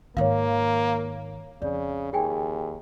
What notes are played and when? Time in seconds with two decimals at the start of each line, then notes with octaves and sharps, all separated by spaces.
0.17 G#2 D#3 A#3 C#5 F5
1.62 F2 C#3 D5
2.13 D#2 G#4 G5 G#5